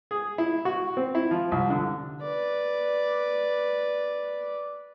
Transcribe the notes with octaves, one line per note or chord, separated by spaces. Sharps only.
G#4
E4
F#4
C4
E4
F3
C2
D3
B4 D5